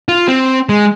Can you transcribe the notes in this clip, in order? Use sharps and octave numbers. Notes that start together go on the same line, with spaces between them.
F4
C4
G#3